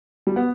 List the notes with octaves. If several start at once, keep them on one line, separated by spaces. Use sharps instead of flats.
G3
B3